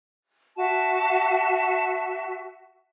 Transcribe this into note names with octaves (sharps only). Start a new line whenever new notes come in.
F#4 E5 A5